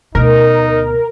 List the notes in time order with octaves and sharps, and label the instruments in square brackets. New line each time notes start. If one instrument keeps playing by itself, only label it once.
[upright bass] D2 B2 [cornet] D#4 [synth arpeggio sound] A#4